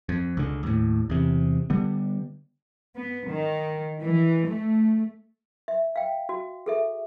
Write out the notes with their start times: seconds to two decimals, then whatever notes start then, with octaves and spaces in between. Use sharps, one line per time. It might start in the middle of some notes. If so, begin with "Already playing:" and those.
0.09 F2
0.37 C#2 D3
0.63 D#2 A2
1.10 E2 C3
1.70 D3 G3 B3
2.95 B3
3.27 D#3
4.02 E3
4.48 A3
5.68 E5
5.96 F5 G5
6.29 F#4
6.66 G#4 A4 E5